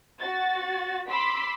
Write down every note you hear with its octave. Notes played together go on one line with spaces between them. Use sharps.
F#4 A6
B5 C6 D6 E6 B6